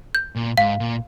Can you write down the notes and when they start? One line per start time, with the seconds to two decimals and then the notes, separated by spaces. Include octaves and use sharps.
0.15 G6
0.36 A#2
0.58 G#2 F5
0.80 A#2